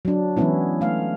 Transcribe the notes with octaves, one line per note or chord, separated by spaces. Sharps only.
F#3 D4
E3 F#3 G#3 B3 C#4 E4
A3 F5